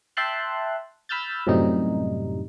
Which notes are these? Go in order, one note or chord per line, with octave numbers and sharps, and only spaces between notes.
E5 G5 A5 C6 F#6
B5 E6 F6 G6 A6
F#2 A2 C3 G3 D#4